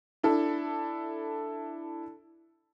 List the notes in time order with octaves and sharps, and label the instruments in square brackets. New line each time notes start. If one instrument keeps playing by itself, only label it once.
[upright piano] D4 E4 A4